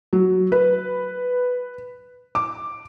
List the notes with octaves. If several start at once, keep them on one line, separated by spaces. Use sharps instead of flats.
F#3
B4
D6